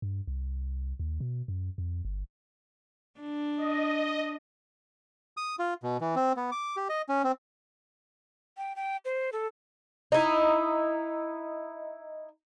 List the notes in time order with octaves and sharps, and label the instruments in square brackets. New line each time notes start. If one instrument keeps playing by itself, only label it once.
[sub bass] G2
C2
D#2
B2
F#2
F2
G1
[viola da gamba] D4
[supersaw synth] D#5
[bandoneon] D#6
F4
B2
E3
C4
B3
D6
G4
D#5
C#4
C4
[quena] G5
G5
C5
A4
[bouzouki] D#4 E4